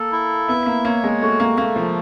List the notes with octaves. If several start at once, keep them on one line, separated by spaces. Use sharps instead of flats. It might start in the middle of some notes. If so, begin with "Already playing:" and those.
Already playing: A#3 A4
E4
B3 E5
A#3
A#3 C#5
G#3
A3 F#4
A#3
A3 A#3
F3